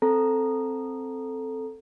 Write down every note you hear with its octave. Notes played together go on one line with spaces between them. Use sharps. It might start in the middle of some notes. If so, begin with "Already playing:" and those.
C4 A4 A#5